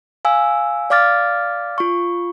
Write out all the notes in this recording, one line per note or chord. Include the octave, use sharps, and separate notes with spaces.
F5 G#5 E6
D5 F5 D6 F6 A6
F4 C#6